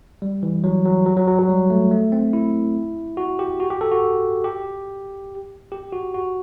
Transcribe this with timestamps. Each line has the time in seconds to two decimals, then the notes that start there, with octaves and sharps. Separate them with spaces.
0.22 G3
0.43 E3
0.64 F#3
0.85 F#3
1.06 F#3
1.17 F#3
1.27 F#3
1.39 F#3
1.49 G3
1.70 A3
1.91 A3
2.12 C4
2.33 E4
3.17 F#4
3.39 G4
3.60 F#4
3.70 G4
3.81 A4
3.92 F#4
4.44 G4
5.72 G4
5.93 F#4
6.14 F#4